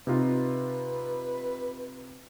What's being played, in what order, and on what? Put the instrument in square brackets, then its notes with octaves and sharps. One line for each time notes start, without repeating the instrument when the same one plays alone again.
[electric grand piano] C3 D#4 F4 [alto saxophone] B4